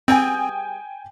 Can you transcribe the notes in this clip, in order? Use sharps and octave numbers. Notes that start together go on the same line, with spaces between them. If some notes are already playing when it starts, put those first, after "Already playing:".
G3 B3 C4 G#4 G5 G#5 G6